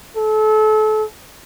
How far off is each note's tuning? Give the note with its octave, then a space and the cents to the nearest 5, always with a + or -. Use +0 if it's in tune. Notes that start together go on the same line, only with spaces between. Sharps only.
A4 -30